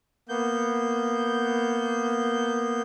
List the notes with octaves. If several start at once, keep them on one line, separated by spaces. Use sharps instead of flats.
A#3 B3 G6